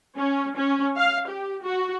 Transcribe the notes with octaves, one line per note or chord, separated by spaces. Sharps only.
C#4
C#4
F5
G4
F#4